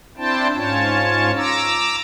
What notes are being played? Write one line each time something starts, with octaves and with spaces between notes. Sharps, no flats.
C4 D4 E4 C5 G5 A5
G#2 C#4 F4 C#5 A5
A#5 D6 E6